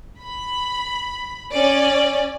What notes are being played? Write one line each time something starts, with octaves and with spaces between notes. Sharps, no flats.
B5
C#4 D5